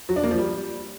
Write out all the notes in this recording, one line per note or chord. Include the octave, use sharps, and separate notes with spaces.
F#3
D4
A#3
F3
G3